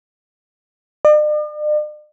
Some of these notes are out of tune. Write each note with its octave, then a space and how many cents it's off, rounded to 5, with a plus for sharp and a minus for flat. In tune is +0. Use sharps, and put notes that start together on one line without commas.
D5 +45